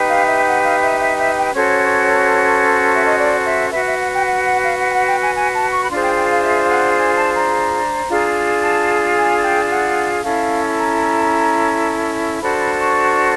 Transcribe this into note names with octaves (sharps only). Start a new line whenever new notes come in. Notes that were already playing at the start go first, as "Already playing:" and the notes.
Already playing: D#4 G4 B4
F5
E5
F#5
F5
E5
E5
E5
G5
C#4 F#4 A4 C5 C#5
E5
D#5
D5
E5
F#4 B4 E5
E5
F#5
G5
F#5
F#5
F5
F#5
G5
F#5
G5
G#5
G#5
A5
C#6
B5
D4 F4 G#4 C5 C6
G5
G5
F5
E5
F5
F#5
G#5
A5
A#5
D4 F4 G#4
A5
G#5
G5
F#5
C#4 E4 A4 F5
A#5
D4 F#4 A4 C5 B5
B5
C#6